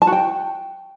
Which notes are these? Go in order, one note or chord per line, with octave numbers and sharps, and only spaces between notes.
A5
F#4
G5